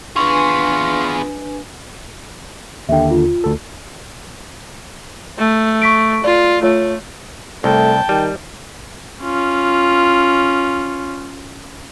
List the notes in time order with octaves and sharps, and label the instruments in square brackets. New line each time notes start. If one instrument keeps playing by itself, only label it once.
[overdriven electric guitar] B3 G#4 [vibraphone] D4 B4 G#5 [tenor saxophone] F4 [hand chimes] C6 C#6
[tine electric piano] D#2 D3 [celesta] E5 G5
[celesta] F4
[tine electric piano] D2 A4
[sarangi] A3
[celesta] C#6 B6 D7
[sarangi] F4 [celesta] D5
[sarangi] A3 [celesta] F4 C#5
[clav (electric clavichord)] C2 [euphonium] A3 [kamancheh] G5 A5
[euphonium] D#3 [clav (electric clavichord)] G3
[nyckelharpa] C#4 F4